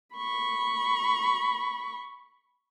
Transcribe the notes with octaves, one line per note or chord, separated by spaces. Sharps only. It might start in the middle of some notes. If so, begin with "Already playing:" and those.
B5 C#6